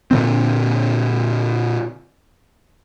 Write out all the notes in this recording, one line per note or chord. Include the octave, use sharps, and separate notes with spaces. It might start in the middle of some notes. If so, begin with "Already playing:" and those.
A#2 D3 C4